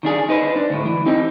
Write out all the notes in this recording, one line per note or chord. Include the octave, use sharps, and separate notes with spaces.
D#3 D4 G#4
D#4 B4 C5
D4
D2 A2
E3
C4 D#4 G4